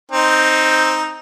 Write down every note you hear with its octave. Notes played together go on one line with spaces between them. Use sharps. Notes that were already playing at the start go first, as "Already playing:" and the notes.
C4 D#4